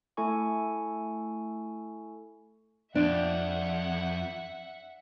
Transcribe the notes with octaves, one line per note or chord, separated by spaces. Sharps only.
A3 E4 A4 G#5 C#6
F2 D4 E5 F#5